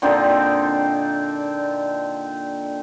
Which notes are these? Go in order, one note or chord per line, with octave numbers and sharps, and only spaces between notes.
A#2 D3 C4 D#4